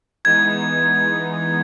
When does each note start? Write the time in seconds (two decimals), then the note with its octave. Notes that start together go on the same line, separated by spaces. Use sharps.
0.25 E3 G#3 B3 D#4 G#6